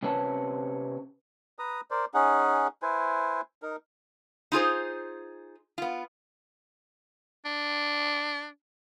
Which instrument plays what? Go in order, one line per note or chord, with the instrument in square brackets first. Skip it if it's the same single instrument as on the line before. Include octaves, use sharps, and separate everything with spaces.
[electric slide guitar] C3 C4 C#4 B4 C#5 A5
[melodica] B4 A#5 D#6
A#4 C5 D5
C#4 D#4 G#4 F#5
E4 B4 C5 G#5
D#4 A#4
[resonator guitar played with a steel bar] D#4 F4 G#4 C5
B3 F4
[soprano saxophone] D4